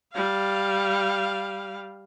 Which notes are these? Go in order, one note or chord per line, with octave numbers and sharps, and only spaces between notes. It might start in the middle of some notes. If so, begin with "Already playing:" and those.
G3 F5